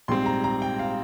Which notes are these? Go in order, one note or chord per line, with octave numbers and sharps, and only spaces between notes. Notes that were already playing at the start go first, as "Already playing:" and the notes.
A#1 G#2 G3 C4 C6
A#5
A#5
G5
F5